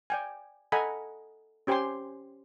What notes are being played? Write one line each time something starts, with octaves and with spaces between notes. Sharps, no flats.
D5 G5 G#5
A4 D#5 F#5 G#5 A#5 B5
C#4 G4 C5 G5 G#5 C6